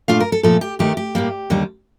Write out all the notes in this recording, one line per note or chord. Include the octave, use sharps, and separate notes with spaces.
A#2 A3 D4 F4 F5
A#4
A4
A#2 F3 A3 A4
G4
D#2 D#3 A3 G4
G4
A2 G3 A#3
D#2 D3 G3